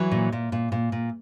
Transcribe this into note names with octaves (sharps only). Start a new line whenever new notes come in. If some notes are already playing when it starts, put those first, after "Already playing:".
Already playing: E3 F#3
A#2
A#2
A#2
A#2
A#2